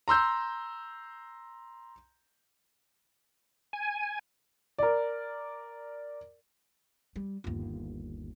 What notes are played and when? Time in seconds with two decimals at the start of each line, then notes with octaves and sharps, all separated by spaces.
0.08 A#5 C6 E6 G6
3.73 G#5
4.79 A#4 D5
7.16 G3
7.44 G1 D#2